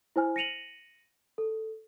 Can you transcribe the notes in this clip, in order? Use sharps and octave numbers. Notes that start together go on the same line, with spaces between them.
E4 C5 G#5 F6
A#6 C#7 D#7 F7 F#7
A4